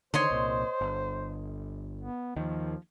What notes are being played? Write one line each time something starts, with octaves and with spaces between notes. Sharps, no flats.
D3 D#3 C5 C#5 D#5 C6
C2 A#2
G1
B3
D#2 D#3 F3